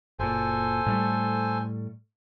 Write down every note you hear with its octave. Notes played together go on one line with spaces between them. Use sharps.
F#1 A#2 A4 C5 G#5
A2 G3 A3